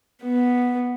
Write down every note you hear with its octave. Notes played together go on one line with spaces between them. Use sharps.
B3